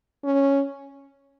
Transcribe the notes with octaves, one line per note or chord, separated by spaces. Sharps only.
C#4